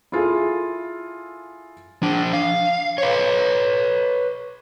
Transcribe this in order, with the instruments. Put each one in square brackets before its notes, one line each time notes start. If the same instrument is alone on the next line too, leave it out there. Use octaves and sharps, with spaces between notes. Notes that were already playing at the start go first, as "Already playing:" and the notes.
[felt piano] E4 F4 G#4 A4
[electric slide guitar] F3 D4
F5
B4 C#5